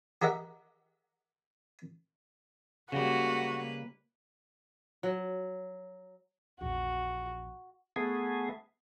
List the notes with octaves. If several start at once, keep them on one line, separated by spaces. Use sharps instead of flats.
G4 A#4 D#5 E5 F#5
C#3 G3 G#3 A#3 F#4 B4
F#3
A#1 E2 F#4
A3 B3 G#4